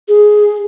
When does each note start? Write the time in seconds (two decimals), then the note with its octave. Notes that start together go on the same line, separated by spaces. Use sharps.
0.08 G#4